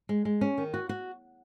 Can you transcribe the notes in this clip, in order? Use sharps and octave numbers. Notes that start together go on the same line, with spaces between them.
G#3
G#3
C#4
D#3
F#4
F#4